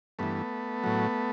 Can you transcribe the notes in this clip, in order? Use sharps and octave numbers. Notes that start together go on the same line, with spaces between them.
G2 E3 A3 B3
A2 F#3